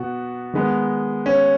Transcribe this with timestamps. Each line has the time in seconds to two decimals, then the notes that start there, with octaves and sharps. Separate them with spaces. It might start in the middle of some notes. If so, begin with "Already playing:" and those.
Already playing: B2 B3 F#4
0.53 D#3 G#3 B3
1.26 C#4